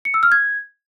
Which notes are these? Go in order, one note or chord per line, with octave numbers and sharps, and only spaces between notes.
C#7
E6
F6
G#6